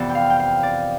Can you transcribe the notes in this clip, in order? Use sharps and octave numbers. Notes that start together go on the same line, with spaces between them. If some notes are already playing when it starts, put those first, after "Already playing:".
Already playing: F2 C3 E3 B3 D5
G5
F5
G5
F5
D5